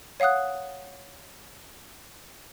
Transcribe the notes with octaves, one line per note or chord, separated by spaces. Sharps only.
C#5 F5 F#5 D#6 F#6